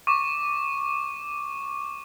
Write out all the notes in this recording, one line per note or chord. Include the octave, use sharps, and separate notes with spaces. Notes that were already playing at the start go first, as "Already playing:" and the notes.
C#6 D6